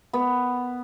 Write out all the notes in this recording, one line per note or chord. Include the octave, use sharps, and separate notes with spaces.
B3